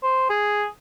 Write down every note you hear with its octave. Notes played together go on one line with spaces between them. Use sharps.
C5
G#4